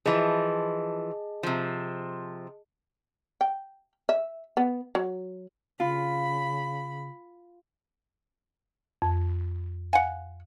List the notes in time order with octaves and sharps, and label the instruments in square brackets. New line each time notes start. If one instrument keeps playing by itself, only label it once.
[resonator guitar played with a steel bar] E3 F3 [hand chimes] G#4 D#5 A5
[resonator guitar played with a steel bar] C3 F3
[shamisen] G5
E5
B3
F#3
[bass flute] C#3 [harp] F4 [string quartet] B5
[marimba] F2
[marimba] F5 [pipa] F#5 G#5